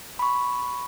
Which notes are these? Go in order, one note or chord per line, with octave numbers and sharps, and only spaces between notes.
B5 C#6